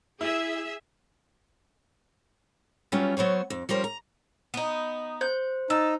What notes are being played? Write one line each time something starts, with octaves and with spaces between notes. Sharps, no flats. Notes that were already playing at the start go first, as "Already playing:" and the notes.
E4 G#4 E5
F#3 G3 B3 C#4 F4
F#3 B3 C5 C#5
F2
F3 G3 C#4 A#4 C5
A#5
B3 D#4
C5 G6
D#4 A5 E6